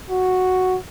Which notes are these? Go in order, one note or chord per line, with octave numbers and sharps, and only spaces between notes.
F#4